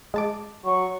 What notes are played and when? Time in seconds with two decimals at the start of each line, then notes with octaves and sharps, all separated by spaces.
0.14 G#3 A5 D6
0.64 F#3 C#6